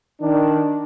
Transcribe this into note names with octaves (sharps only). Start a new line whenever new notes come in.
D#3 D4